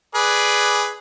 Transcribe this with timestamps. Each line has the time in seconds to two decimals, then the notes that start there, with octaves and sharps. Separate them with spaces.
0.15 G#4 B4 D5